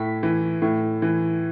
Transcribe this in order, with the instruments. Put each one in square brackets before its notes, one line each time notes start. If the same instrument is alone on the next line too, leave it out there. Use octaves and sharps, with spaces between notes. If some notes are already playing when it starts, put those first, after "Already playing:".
Already playing: [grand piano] A2 B6
E3
A2
E3